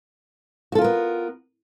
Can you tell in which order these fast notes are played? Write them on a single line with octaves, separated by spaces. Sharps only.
F#4 A4 F4 A#4 B3